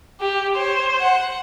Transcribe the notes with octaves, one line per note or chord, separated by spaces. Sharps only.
G4
C5 C#5
F#5